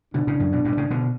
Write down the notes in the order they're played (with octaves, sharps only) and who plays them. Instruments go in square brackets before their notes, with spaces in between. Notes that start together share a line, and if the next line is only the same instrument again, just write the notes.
[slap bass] B2 D3 [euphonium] D4
[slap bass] A2 C#3
F#2 A2
G2 B2
G2 B2
A2 C#3
B2 D3